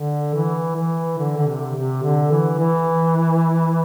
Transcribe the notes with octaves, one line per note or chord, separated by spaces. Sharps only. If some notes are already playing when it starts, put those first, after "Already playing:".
Already playing: D3
E3
E3
D3
D3
C3
C3
D3
E3
E3